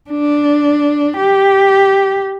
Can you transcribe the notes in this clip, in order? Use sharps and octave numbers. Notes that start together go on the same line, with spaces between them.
D4
G4